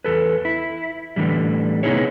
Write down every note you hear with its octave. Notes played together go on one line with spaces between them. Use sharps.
E2 A4 B4
E4
A2 D3 E3 G3
C3 B3 D#4 E4 G#4 C#5